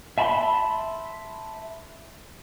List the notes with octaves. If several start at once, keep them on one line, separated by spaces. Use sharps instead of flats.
E5 A5 B5 C6